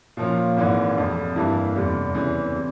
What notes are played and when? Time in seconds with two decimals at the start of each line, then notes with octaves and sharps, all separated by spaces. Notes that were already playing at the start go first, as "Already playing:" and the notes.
0.17 A#2 F3 A#3 C#4
0.57 G#1 G#2 E3 A#3
0.96 F1 F2 C3
1.36 G2 E3 G3 A#3 E4
1.75 F1 E2 C3 G3
2.15 E2 C#3 E3
2.55 C3